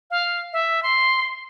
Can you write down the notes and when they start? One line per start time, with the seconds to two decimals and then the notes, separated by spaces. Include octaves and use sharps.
0.11 F5
0.53 E5
0.83 C6